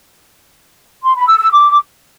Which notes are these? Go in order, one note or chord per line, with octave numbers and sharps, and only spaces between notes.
C6
B5
E6
E6
D6